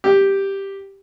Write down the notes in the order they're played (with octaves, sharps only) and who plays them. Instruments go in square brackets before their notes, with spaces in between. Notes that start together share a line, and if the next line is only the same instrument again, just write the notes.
[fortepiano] G4